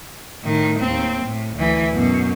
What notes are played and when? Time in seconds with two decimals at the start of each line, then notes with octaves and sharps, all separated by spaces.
0.43 A2 D#3
0.80 D#2 C4
1.25 A2
1.56 D2 E3
1.93 F#2 B2